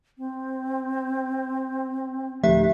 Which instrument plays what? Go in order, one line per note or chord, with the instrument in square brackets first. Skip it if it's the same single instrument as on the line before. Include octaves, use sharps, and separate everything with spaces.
[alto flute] C4
[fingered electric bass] D1 D2 A3 [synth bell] F3 G4 [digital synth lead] E5